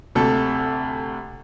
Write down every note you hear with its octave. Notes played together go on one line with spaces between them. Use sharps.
D2 C3 G4 A4